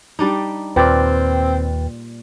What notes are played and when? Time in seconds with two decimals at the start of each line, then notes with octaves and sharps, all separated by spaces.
0.19 G3 D4 D#4
0.76 D#2 A#2 C4 B4 D5 G5 A6